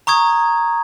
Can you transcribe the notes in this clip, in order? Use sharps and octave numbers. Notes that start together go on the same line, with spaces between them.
A#5 C#6 D#6 G#6